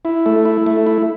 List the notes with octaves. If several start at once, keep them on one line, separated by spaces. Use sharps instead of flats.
E4
A3
E4
A3
E4